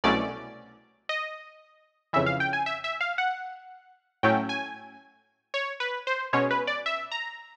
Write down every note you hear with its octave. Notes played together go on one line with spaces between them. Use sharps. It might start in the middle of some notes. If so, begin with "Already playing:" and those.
C2 B2 F#3 A3 C#4 D5
D#5
F2 C#3 E3 E5
F5
G5
G#5
E5
E5
F5
F#5
A2 F#3 A3 C#4 G5
G#5
C#5
B4
C5
B2 G#3 C#4 C#5
B4
D5
E5
A#5